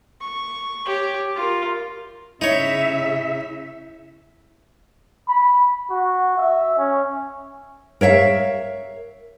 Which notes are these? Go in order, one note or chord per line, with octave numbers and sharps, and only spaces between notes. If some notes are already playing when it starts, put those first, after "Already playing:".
C#6
G4 C#5
F4 A#4
C#3 D#4 E4 C#5 E5
B5
F#4
E5
C#4
A#4 C#5 E5 F5